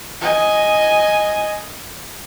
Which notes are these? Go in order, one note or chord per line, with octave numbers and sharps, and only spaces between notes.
D#5 G#5